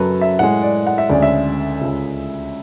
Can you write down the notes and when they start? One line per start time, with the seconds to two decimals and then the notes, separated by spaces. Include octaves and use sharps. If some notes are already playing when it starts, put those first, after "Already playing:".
Already playing: F#2 C#3 F#3 A4 B4
0.21 E5
0.39 A2 G#3 F#5
0.62 D5
0.87 F#5
0.98 E5
1.10 D2 C#3 G#3 D5
1.22 E5
1.81 C#2 C#3 G#3